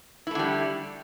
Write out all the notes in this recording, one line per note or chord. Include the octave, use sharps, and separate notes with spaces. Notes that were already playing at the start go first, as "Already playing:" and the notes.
D3 G3 A3 E4